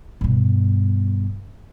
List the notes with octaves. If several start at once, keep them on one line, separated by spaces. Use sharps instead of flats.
G2 B2